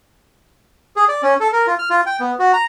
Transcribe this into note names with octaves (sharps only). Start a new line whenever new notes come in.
G#4
D5
C#4
A4
A#4
F4
F6
F4
G5
B3
F#4
A#5